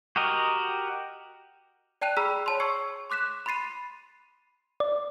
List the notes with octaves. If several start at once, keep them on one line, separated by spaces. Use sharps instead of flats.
F#4 G4 A#4 D#5
D5 G5 A5 F#6 D#7 F7
G#4 A#5 B5 E6 F6 B6
C#5 A5 C6
C#6 E6 G#6 C7 C#7
C6 D6 F#6 B6 E7
B5 C6 A6 C7 D#7
D5